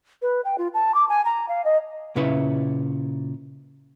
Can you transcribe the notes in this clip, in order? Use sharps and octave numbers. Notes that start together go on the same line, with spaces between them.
B4
G5
F4
A5
D6
G#5
A#5
F5
D#5
A#2 C#3 C#4 E4 B4 E5